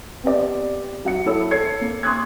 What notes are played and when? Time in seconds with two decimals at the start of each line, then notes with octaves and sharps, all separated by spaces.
0.23 B3 C4 G4 D5
1.05 F#3 F#5 C#7
1.26 E4 A4 C#5 E6
1.51 A4 C#5 G#6 C7 C#7
1.81 A#3
2.03 C6 C#6 D#6 E6 F#6 G#6